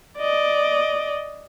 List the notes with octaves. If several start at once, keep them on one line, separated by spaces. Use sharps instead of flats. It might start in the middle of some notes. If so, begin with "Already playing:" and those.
D5 D#5